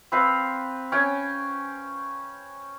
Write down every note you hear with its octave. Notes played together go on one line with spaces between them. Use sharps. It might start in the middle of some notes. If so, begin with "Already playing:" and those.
C4 B4 F5
C#4 G5 G#5